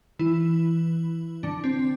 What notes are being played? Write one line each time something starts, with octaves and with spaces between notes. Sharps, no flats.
E3 E4
D3 D4
C4